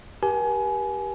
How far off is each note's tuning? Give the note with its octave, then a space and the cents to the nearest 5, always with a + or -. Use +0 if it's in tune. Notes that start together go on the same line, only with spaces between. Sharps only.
G4 +0 A#4 +45 G#5 +25